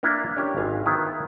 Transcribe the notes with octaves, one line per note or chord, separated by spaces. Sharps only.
A#3 D4 E4 F4 A#4
C#4 D4 F4 G4 A#4
G#1 F5 G#5
D#3 B3 E4 F4